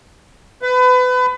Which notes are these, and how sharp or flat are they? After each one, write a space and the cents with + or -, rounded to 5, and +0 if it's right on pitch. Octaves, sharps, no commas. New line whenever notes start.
B4 +30